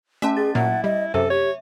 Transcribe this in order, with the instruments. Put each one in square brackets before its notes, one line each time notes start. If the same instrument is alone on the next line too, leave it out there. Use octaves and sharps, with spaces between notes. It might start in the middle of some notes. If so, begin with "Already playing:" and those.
[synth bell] A3 C#4 A5 [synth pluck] E5
[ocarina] G#4 [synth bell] A6
[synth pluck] A#2 F#3 A#3 [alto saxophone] E4 [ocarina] F#5
[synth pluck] G3 [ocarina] D#5
[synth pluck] F#2 C3 [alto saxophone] A4 [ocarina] C5 [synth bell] E5
[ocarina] G4 [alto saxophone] C#5